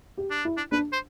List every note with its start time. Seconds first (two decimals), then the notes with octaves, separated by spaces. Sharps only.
0.18 G4
0.31 D4
0.45 E4
0.57 D4
0.72 D4 B4
0.92 C5